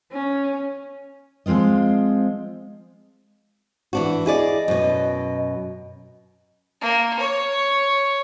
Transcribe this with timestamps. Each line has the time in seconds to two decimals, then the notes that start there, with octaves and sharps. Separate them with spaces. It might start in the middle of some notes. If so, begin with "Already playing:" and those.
0.12 C#4
1.46 F3 G#3 C4 F4 D#5
3.93 E3 D4 F#4
4.26 E4 G#4 D5 D#5
4.68 F#2 B2
6.81 A#3
7.19 C#5